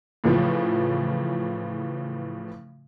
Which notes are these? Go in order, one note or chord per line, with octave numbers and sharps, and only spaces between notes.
A2 C#3 E3 F3